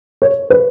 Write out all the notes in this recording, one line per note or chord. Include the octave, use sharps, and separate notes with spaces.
C#5
B4